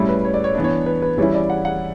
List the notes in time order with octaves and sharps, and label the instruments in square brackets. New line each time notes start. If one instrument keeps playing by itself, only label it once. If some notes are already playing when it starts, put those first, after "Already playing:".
Already playing: [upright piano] A2 G3 C#4 E4
B4
C#5
D5
C#5
E3 B3 D4 D5
C#5
B4
B4
E3 G3 C#4 E4 C#5
D5
F#5
F#5